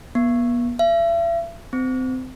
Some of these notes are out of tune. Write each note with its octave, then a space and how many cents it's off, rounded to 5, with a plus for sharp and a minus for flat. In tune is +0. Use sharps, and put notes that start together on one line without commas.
B3 -40
E5 +40
C4 -25